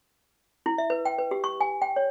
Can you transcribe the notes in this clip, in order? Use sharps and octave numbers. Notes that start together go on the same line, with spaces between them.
E4
E5
B4
G5
B4
G4
C#6
G#5
G5
C#5